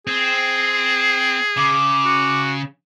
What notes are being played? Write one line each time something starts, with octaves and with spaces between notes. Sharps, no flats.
C4 G#4
C#3 D6
F#4